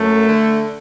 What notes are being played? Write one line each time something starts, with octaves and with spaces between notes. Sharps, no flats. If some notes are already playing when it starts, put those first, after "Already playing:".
Already playing: F#2 A3
D3